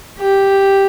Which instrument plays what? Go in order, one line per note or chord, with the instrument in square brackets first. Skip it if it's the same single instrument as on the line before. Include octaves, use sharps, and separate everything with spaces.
[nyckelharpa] G4